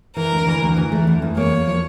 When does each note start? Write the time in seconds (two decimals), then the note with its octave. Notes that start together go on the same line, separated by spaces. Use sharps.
0.17 E3 A#4
0.32 D2
0.47 E3
0.62 D2
0.77 E3
0.92 A3
1.07 E2
1.22 E2
1.37 A#3 C#5
1.52 A#3
1.68 F3